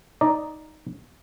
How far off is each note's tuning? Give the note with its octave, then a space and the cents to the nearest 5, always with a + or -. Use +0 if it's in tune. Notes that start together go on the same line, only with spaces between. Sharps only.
D#4 +0 D5 +0 A#5 +0